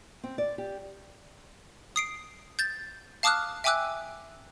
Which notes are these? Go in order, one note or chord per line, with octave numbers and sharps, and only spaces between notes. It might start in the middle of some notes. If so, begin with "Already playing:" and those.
C4
D5
G4
D#6 C7 D7
G6 A6
F5 A5 D6 D#6 F6 F#6
E5 G5 G#5 D6 E6 F#6